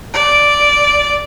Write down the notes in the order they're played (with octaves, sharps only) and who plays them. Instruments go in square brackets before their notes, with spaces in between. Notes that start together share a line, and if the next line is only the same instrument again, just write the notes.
[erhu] D5